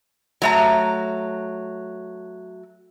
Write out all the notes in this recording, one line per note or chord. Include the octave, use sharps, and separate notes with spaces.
F#3 A3 A#5